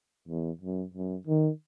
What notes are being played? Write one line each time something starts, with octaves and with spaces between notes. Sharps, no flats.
E2
F#2
F#2
D#3